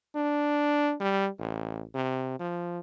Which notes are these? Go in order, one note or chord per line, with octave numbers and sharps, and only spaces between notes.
D4
G3
A1
C3
F3